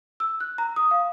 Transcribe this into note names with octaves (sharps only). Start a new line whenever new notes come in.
E6
F#6
A#5
D#6
F5